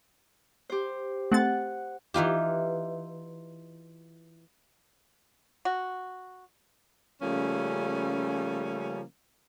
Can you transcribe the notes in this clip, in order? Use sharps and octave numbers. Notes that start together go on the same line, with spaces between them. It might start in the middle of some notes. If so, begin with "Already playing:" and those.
G4 C5
A3 C4 F#5 A6
E3 D#4 F4 G4
F#4
C#3 F3 G3 A3 A#3 C#4